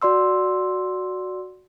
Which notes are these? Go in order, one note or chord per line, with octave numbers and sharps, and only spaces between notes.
F#4 D5 C6 E6